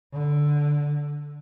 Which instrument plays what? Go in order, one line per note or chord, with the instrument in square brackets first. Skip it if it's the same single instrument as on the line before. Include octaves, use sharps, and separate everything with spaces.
[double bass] D3